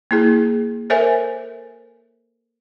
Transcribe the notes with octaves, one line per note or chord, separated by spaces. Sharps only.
A#3 E4 G#4
A4 A#4 C5 C#5 E5 G#5